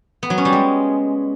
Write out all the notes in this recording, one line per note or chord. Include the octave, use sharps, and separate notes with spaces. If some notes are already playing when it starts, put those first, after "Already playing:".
B3
F#3
C#4
G3
G#3